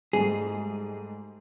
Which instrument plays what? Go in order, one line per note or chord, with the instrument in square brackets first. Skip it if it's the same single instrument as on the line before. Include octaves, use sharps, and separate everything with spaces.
[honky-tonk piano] G#2 G3 A3 [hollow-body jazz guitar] G#4